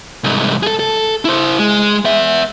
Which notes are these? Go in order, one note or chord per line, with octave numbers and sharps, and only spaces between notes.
C2 G#2
G#4 A4
A4
E4 C5
G#3
B3 E5